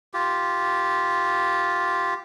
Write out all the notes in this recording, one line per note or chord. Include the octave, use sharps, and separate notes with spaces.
F4 G4